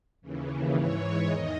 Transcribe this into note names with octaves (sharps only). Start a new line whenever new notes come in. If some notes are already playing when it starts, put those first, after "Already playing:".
D#2 C#3 E3
G#2 E3 C#5
E2 D#3 D#5